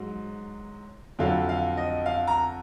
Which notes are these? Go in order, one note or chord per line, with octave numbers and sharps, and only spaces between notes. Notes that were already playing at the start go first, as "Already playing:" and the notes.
Already playing: G#2 F#3
F2 D3 F#3 F5
F5
D#5
F5
A#5